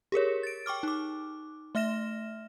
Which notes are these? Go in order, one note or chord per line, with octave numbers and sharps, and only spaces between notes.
G4 G#4 A#4 C#5
A6 D7
G5 C#6 D6 F6
D#4 D6
A3 E5 F6 A#6 E7